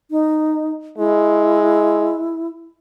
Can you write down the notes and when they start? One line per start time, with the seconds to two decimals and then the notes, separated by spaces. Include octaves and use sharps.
0.11 D#4
0.98 G#3 E4